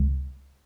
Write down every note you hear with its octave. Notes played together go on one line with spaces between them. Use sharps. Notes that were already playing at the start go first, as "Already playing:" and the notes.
Already playing: C#2